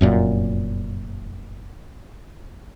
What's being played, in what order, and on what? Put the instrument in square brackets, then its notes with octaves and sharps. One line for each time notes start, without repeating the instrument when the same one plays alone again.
[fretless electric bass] F1 F#2 A#2